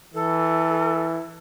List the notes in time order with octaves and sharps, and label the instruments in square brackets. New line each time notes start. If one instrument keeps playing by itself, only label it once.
[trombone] E3 [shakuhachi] A4